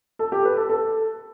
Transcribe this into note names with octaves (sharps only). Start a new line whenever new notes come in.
A4
G4
B4
A4
A4